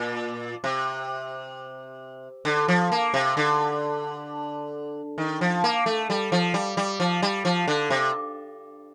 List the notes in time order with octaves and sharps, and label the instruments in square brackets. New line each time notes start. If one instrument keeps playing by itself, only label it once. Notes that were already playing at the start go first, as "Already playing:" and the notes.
Already playing: [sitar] A#2
C3
D3
F3
A#3
C3
D3
D#3
F3
A#3
A3
G3
F3
G3
G3
F3
G3
F3
D3
C3